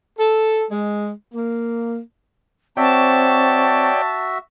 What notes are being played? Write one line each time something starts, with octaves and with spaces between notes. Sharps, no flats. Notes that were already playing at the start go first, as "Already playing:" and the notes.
A4
G#3
A#3
C4 F#4 C#5 D5 E5 G5 A5